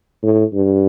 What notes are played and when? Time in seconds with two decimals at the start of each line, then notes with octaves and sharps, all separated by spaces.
0.23 A2
0.53 G2